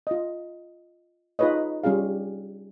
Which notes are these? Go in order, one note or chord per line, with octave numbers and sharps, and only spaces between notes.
F4 D#5
D#4 F4 G#4 B4 C#5 D#5
G3 C#4 F4 G#4 F5